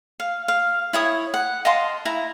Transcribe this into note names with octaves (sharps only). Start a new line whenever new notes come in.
F5
F5
E4 C#5 D#6
F#5
D#5 F5 A5 C6
E4 A#5